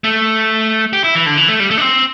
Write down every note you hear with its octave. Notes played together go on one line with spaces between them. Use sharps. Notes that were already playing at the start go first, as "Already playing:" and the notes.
A3
G4
E4
E3
D3
E3
A3
G3
A3
D4
C4